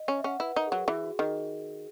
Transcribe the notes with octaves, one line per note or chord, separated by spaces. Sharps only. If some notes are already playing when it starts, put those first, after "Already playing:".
Already playing: D#5
C#4
E5
C#4 F#5
E4 B4
D#4 A#4
G#4
F#3
F#4
E3 G#4
F#4
D#3 G#4